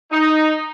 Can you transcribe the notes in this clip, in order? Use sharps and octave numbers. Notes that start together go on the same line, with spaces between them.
D#4